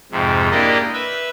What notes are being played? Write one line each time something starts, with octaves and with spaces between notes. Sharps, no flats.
F2 G#2 C3
A#3 D4 E4 G4 D5 D#5
B4 E5